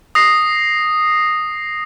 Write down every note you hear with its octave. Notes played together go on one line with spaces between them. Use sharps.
D#6 A#6 C7